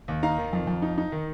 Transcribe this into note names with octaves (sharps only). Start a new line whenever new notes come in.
D#2
D#4 F5 A#5
D#3
F2
F2
D#4
D#4
D#3